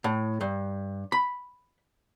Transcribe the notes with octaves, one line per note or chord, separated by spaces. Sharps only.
A2
G2
B5